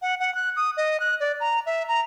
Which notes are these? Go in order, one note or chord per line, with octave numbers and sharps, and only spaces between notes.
F#5
F#5
F#6
D#6
D#5
F#6
D5
A#5
E5
A#5